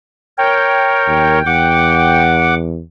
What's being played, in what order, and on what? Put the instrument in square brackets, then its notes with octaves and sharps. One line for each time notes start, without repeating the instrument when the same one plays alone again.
[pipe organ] A#4 C#5 [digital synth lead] G5
[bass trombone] D#2
[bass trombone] E2 [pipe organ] F#5 D6